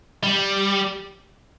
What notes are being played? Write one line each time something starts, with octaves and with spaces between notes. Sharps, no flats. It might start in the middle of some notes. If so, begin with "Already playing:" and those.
G3